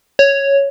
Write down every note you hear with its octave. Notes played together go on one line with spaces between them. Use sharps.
C#5